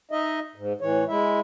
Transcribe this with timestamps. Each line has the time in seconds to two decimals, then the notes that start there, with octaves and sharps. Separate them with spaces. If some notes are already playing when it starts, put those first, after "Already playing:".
0.11 D#4 D#5 E5
0.55 G#2
0.81 A2 E3 C#5
1.08 G#3 E4 E5